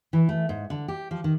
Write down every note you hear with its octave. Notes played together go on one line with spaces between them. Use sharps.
E3
A3
G#2
D3
G4
F3
D#3